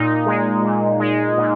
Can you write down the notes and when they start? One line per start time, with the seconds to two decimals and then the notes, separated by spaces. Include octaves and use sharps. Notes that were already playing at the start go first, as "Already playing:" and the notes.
Already playing: A#2 D#4
0.26 G#3
0.62 A#2
1.00 G#3
1.37 A#2